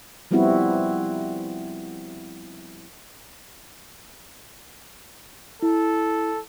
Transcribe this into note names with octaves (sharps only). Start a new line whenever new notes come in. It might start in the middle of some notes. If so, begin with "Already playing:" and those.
F3 G3 B3 C4 E4 F#4
E4 A4